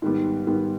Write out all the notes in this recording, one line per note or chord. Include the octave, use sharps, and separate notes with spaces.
G#2 D#3 G3 B3
G#2 D#3 G3 B3